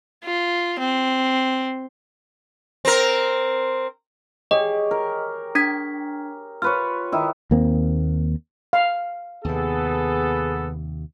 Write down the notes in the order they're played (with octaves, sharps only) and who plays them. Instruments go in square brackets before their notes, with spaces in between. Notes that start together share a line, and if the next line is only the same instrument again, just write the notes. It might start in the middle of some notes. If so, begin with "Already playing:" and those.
[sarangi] F4
C4
[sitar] C4 A#4
[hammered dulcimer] G4 G#4 C#5 [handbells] D#5
[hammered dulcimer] A#4
[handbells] D4 G#6 B6
[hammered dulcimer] F4 B4 C#5 [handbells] F6
[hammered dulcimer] D#3 E4
[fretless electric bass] D#2 A#3 C4
[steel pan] F5
[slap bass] D#2 C3 [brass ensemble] B3 G#4 A4